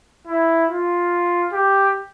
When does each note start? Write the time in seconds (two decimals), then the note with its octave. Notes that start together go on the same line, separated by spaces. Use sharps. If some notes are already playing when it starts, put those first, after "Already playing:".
0.27 E4
0.70 F4
1.52 G4